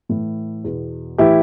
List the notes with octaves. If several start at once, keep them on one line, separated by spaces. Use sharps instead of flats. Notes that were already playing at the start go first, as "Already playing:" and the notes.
A2 E3
E2 B2
A2 E3 E4 G4